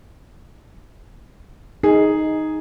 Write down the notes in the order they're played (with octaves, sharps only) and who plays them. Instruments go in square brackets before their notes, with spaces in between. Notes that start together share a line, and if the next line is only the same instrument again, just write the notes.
[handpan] D#4 [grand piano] G#4